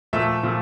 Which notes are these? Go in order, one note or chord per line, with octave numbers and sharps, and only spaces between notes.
A#2 F3 A3 E5
A#2 F3 A3